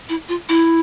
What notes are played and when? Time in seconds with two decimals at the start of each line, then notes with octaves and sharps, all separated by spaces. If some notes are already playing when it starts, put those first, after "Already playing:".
0.09 E4
0.29 F4
0.49 E4